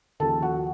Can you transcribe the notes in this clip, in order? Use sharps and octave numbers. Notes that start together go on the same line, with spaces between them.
D#2 C#3 F3 A4 A5
F#4 F#5